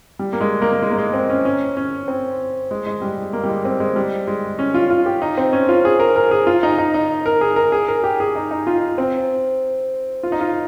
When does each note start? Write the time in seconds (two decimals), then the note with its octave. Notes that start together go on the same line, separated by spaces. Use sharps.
0.19 G3
0.33 A#3
0.41 G#3
0.62 A#3
0.72 A#3
0.82 G#3
0.91 A#3
0.98 G#3
1.13 C4
1.30 C#4
1.45 C#4
1.77 C#4
2.08 C4
2.71 G#3
2.86 G#3
3.02 G3
3.18 G#3
3.33 A#3
3.44 G3
3.49 G#3
3.65 C4
3.80 G#3
3.96 G3
4.27 G#3
4.59 C#4
4.74 F4
4.90 F4
5.06 G4
5.22 D#4
5.37 C4
5.53 C#4
5.69 F4
5.85 G#4
6.00 A#4
6.16 A#4
6.31 G#4
6.47 F4
6.63 D#4
6.78 D#4
6.94 D#4
7.26 A#4
7.41 G#4
7.56 A#4
7.72 G#4
7.88 A#4
8.04 G4
8.20 G#4
8.35 D#4
8.51 D#4
8.67 F4
8.98 C4
10.23 F4
10.32 D#4
10.41 F4